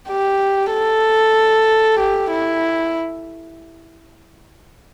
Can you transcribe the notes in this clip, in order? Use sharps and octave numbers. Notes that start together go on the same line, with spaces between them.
G4
A4
G4
E4